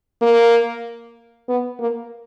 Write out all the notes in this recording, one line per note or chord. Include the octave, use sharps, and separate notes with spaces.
A#3
B3
A#3